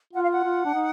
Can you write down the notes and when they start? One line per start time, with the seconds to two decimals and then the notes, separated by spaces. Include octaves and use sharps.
0.13 F4 F#5
0.22 F5
0.31 F#5
0.44 F4
0.65 D4
0.74 D#4